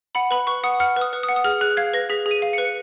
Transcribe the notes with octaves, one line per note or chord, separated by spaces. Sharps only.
F#5 B5
B4 B5
B4 C#6
F#5 D#6
F#5 F6
B4
D#6
B4
D#6
F#5
D#6
G#4 F6
G#4 F#6
F5 G#6
B4 A#6
G#4 B6
G#4
D#7
F5
C#7
B4
C#7